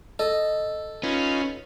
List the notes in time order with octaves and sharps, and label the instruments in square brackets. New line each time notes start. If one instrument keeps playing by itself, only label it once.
[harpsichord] A4 [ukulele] D#5
[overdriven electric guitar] C#4 [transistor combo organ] D#4 F4 B4